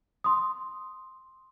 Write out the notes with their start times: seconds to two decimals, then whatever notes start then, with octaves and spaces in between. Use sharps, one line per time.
0.24 C6 D#6